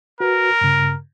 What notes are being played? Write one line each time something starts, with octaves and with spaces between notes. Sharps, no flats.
F#4 A#4 B4
G2 C#3